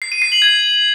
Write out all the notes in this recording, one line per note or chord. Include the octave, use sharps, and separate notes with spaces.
C7
D#7
C7
F#7
G#6